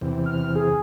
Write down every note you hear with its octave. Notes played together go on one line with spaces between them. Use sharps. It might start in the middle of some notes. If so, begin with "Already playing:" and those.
E2 C3
F6
G#4